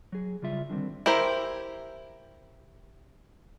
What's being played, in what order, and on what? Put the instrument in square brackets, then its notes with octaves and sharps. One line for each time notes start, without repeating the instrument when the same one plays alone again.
[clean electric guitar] F#3 G#4
C#3 G3 F4 E5
D3 D#3 G3 C4
[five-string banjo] E4 G4 A#4 C5